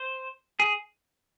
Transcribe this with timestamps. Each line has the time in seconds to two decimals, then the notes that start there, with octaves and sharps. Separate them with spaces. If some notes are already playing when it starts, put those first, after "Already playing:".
Already playing: C5
0.60 G#4